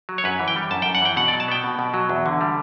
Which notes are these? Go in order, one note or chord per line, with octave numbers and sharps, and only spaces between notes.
F#3
C#5
F#2 B4
E3
G5
G3
F#2 A5
F#2 G5
F#5
E3 G5
B2 F#5
D5
F#3
A5
B3 G5
B2
B2
F#3
E2
D3
G3